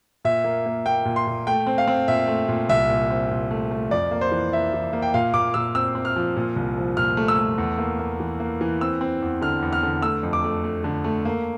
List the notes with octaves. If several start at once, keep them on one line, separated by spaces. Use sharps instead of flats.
A#2 E5
A#3
A#3
A#3 G5
A#2
C6
A#2
A3 G5
C4
F5
C4
A#2 E5
A3
A#2
C2 E5
A#2
C4
A#2
A3
A3
F2 D5
A#3
C5
E3
A#3 E5
E3
A#3
G5
A#2 F5
A#2 D6
A#2 E6
C4 E6
C4
F6
F3
A#2
C2
F3
A#2 F6
A3
E6
A3
E2
A#3
A#3
E3
A#3
E3
C4 E6
C4
E2
D3 F6
E2
F6
D3
A3 E6
F2
D6
A3
A3
D3
A3
A#3